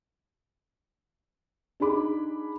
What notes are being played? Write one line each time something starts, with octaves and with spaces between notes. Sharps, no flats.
D4 D#4 G#4 B5 D6